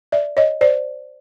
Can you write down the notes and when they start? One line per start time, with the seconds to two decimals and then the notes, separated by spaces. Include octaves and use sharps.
0.12 D5 E5
0.37 C#5 D#5
0.61 C5 D5